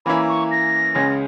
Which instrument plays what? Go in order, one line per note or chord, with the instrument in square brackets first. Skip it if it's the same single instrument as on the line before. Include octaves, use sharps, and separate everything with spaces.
[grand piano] E3 A#3 C#4 E4 [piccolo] B5
[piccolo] C#6
A#6
[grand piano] C#2 C#3 G#3 C#4